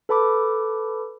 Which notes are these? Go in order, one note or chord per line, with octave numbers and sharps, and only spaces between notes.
A4 B4 A5 B5 D6